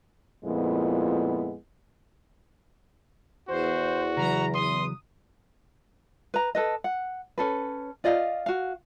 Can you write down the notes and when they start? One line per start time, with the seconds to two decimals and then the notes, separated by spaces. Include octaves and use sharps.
0.44 F2 A#2 G#3 B3 E4
3.48 E2 F#4 C5
4.17 C#3 E3 F#3 A#5
4.55 C6 D#6
6.34 B4 A#5
6.55 A4 B4 D#5
6.84 F#5
7.38 C#4 A4 B4
8.04 F4 D5 D#5 F5
8.46 F#4 F5